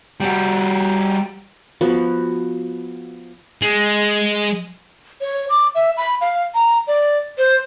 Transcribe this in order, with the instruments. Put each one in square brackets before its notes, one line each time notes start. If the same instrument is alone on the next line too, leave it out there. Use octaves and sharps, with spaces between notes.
[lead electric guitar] G3 F#4
[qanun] F3 B3 F#4
[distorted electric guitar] G#3
[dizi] C#5
D6
E5
B5
F5
A#5
D5
C5